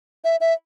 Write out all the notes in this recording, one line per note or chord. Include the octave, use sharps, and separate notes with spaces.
E5
E5